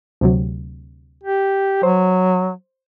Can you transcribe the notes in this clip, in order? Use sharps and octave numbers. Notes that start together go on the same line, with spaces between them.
D2 C3 F#3
G4
F#3 C5